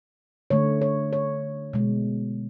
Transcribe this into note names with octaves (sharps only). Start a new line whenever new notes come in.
D3 A3 C#5
C#5
C#5
B2 G#3